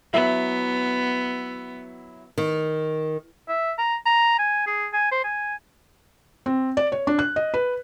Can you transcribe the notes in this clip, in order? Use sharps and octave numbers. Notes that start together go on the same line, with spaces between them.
F#3 B3 E4 E5
D#3
E5
A#5
A#5
G#5
G#4
G#5
C5
G#5
C4
D5
C#5
D4
F#6
D#5
B4